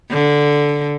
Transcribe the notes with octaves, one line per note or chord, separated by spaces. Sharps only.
D3